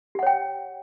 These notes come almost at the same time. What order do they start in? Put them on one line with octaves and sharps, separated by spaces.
G4 F#5 C#5 G5